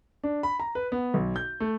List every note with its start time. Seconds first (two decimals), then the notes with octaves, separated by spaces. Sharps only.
0.24 D4
0.43 B5
0.60 A#5
0.75 B4
0.92 B3
1.14 B1
1.36 G6
1.60 A3